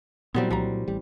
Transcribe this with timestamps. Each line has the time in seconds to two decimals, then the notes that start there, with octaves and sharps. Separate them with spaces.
0.35 A#2 E3 F#3 G3 B3 C4
0.51 C2 F3 G3 A#5
0.88 A1 G3